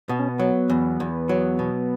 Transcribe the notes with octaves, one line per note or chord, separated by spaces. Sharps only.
B2 B3
C#4
B3
F#3
E2
E2
F#3
B2